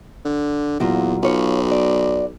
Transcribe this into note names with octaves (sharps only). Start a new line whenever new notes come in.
D3
E2 A#2 F#3 F4
B1 F4 C#5
F#4 D5